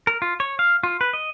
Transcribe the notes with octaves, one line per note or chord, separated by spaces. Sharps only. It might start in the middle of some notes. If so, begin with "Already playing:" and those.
A#4
F4
C#5
F5
F4
B4
D#5